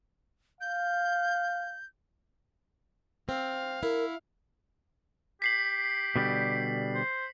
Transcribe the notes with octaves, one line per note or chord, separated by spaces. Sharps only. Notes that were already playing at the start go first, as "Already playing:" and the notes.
F5 G6
C4 F5
E4 A#4
G4 B6 C7 F#7
B2 D3 G3
C5